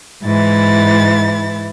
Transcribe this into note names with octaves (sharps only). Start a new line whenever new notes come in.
G#2 E3 E4 A6